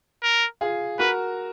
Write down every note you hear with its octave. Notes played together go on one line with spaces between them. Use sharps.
A#4
F4 G#4
F#4 A#4 B4